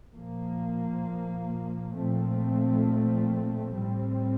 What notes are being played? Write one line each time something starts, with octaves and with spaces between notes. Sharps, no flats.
A#2 F3 A#3
A#2 F3 A3 C4
A2 G3 C4